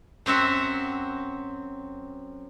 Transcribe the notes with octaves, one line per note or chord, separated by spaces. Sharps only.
F#2 C4 F#4 E5